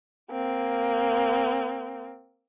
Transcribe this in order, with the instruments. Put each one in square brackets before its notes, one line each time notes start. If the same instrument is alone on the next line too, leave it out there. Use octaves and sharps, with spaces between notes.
[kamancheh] A#3 C4